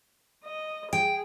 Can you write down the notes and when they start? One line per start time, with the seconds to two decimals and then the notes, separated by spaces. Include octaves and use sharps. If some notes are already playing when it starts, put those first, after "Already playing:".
0.45 D#5
0.93 G#4 G5